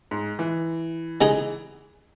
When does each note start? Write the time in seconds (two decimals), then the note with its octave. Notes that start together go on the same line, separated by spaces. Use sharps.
0.11 G#2
0.39 E3
1.21 C#3 G#3 D#4 G#4